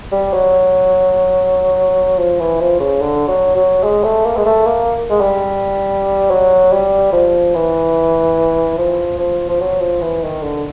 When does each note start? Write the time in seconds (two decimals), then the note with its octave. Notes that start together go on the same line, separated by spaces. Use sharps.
0.12 G3
0.33 F#3
2.19 F3
2.39 E3
2.60 F3
2.80 C#3
3.01 D3
3.28 F#3
3.56 F#3
3.84 G#3
4.04 A3
4.25 A#3
4.37 G#3
4.45 A3
4.65 A#3
5.10 G#3
5.21 G3
6.31 F#3
6.73 G3
7.13 F3
7.55 E3
8.78 F3
9.19 F3
9.49 F3
9.60 F#3
9.81 F3
10.01 E3
10.23 D#3
10.43 D3